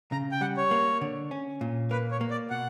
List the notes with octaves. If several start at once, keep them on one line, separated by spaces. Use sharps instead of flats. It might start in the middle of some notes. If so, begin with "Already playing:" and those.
C#3 A#5
G5
G3 F#5
C#5
A#3
D3
C#4
A#2
A#3 B4
C#5
A#3
D5
B2 F#5